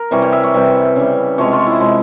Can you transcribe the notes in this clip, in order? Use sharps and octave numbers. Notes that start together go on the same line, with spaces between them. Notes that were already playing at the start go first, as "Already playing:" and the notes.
Already playing: A#4
C3 E3 G3 C#5
C#5
E5
C#5
C3 E3 G3
C#3 G3
C3 F3 G#3 C#5
F4
E4
C3 F3 G#3